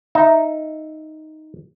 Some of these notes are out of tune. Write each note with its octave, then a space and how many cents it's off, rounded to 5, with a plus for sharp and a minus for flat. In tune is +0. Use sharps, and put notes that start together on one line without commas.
D#4 +0 E5 +0